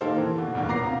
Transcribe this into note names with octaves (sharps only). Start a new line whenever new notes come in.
D#3 A#3 D#4 G4 A4 C5
E3
B2 D3
E2 G2 B2 A#3
D#1 B3 A#5 D6 A#6 C7
C3 F5